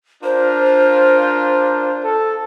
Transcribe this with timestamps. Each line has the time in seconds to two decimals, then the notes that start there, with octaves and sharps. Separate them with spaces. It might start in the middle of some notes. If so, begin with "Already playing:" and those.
0.24 D4 F4 A#4 C5
2.03 A4